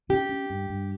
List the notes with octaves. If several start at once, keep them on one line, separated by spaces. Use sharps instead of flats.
C#4 G4
C#4
G2
G2